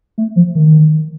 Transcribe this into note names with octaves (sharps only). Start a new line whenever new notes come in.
A3
F3
D#3